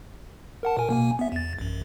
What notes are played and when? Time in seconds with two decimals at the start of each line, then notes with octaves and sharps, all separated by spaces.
0.63 A#4 F#5 A5
0.77 A#2 A#4 G#5
0.89 B2 A#3 G#5
1.19 B3 E5
1.32 E2 A6
1.59 A1 F#2